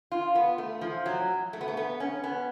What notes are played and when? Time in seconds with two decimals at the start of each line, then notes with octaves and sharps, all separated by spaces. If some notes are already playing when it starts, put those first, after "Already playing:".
0.12 F4
0.35 B3
0.58 A3
0.81 F3
1.06 F#3
1.53 A3
1.61 B3
1.68 A3
1.77 B3
2.00 C#4
2.24 B3